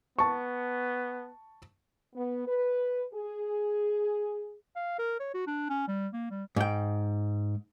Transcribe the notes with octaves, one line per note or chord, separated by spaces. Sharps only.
B3 A5 C#6
B3
B4
G#4
F5
A#4
C#5
F#4
D4
C#4
G3
A#3
G3
G#2 G5